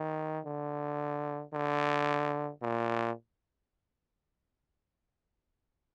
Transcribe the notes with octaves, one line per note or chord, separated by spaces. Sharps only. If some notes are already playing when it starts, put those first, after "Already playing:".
Already playing: D#3
D3
D3
A#2